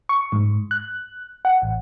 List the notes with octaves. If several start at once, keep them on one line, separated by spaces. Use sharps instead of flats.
C#6
G#2
F#6
F#5
A1